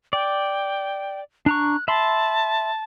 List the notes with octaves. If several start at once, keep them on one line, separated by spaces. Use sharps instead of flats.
D5 G5
D4 A#5 C#6 F#6
E5 A5 B5 C6